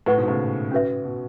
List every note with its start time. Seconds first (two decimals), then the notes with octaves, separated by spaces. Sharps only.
0.06 A2 E4 B4 F#5 C#6
0.17 G#2 B2
0.28 A2 C#3
0.71 C#4 F#4 B4 E5
1.04 B2